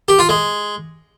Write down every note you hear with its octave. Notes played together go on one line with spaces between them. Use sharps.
G4
F4
G#3